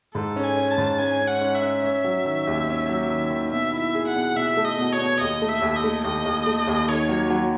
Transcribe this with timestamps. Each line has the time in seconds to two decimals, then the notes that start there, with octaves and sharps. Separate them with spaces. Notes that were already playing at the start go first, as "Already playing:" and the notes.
0.14 G#2 A4
0.36 C#4
0.44 G#5
0.57 C#4
0.71 A5
0.78 G#2
0.99 C#4 G#5
1.20 C#4
1.27 F#5
1.41 C#4
1.55 E5
1.62 C#4
1.83 C#4
2.04 F#3
2.25 D#3
2.47 D#2
2.68 C#4
2.89 F#3
3.09 D#3
3.30 D#3
3.51 B2 E5
3.72 E4
3.79 E5
3.94 G#4
4.08 F#5
4.15 B2
4.36 B2 E5
4.57 A3
4.65 D#5
4.79 B2
4.92 C#5
4.99 B2
5.20 D#2 D#5
5.42 A3
5.49 E5
5.62 D#2
5.76 D#5
5.84 A3
6.04 D#2 D#5
6.25 D#2
6.47 A3
6.67 D#2
6.88 D#3 C#5
7.09 F#3
7.30 F#3